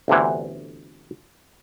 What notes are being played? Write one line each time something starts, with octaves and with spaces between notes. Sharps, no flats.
G1 D2 C3 E3